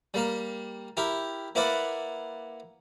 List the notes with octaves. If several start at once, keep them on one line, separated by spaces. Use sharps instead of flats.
G3 A#3 A#4
E4 G4 A#4
A#3 E4 A#4 B4 D5 F#5